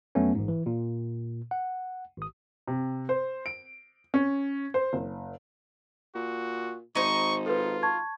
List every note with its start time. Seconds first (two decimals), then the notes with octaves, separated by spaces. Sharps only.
0.15 F2 F#3 A3 B3 C#4
0.35 A1 G#2
0.48 E3
0.66 A#2
1.51 F#5
2.17 G#1 D#6
2.68 C3
3.09 C5
3.46 D7
4.14 C#4
4.74 C5
4.93 F#1
6.15 A#2 F#4
6.95 G#1 D#4 C5 C#6
7.46 F4 A4 B4
7.83 A5 C#6 G#6